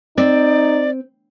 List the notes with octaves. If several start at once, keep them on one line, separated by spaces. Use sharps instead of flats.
C4 D#4 D5